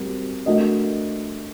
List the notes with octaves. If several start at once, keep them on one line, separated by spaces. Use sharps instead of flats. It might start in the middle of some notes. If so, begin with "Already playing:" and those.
Already playing: G3 C4 F#4 A#4
A3 D4 F#4 A#4 D#5